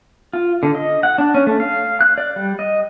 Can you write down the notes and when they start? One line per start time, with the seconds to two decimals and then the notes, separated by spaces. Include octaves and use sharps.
0.33 F4
0.63 D3
0.75 D#5
1.03 F#5
1.18 D4
1.35 C#4
1.47 A3
1.60 F5
2.01 F#6
2.18 D5
2.36 G3
2.59 D#5